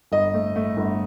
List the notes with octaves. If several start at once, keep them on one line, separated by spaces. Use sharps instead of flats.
G1 D#5
A3
A3
G1